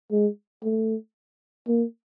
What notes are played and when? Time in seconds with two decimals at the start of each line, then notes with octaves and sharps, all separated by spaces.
0.12 G#3
0.64 A3
1.68 A#3